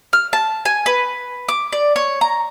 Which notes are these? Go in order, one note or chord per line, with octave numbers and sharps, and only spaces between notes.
F6
A5
G#5
B4
D6
D5
C#5
A#5